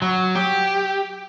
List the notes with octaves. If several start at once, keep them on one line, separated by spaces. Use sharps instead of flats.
F#3
G4